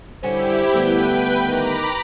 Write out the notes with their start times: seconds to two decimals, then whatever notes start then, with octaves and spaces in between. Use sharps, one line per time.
0.23 D3 G3 C#4 E4 G4 C5
0.73 D3 G3 A3 B3 B4 G5
1.46 D#3 A#5 B5 D6